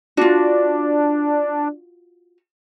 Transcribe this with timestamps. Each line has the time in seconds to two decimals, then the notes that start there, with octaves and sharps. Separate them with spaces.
0.17 D4 F4 F#4